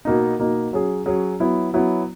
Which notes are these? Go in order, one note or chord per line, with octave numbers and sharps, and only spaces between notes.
B2 A#3 D#4
B2 A#3 D#4
F#3 C#4 G#4
F#3 C#4 G#4
F#3 B3 E4
F#3 B3 E4